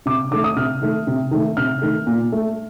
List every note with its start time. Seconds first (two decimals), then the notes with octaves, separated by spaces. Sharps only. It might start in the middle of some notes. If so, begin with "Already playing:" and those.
0.06 C3 D6
0.31 D#3 A3 D6
0.44 D#6
0.56 C3 F6
0.82 D#3 A3
1.07 C3
1.31 D#3 A3
1.57 C3 F6
1.82 D#3 A3
2.07 A#2
2.32 A3